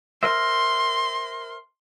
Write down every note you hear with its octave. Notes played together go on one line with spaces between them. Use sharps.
A#4 C5 E5 C6